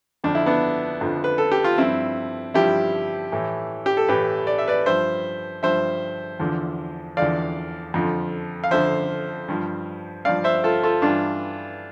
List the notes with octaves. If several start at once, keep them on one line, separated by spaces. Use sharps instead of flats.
F2 D3 F3 D4
E4
B3 D4
F2 D3 F3
B4
A4
G4
F4
G2 F3 C4 E4
G2 F3 E4 G4
A2 E3
G4
A4
A2 E3 G4 B4
D5
E5
B4 D5
G2 F3 C5 E5
G2 F3 C5 E5
E2 D3 F3
E2 D3 F3 D5 F5
F2 D3 F3
F5
F2 D3 F3 C5 E5
G2 F3
G2 F3 D5 F5
C5 E5
F4 A4
F4 A4
G2 E3 D4 F4